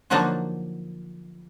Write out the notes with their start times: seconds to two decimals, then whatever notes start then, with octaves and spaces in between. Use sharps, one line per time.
0.10 D3 F3 F#3 A#3 D4 D#4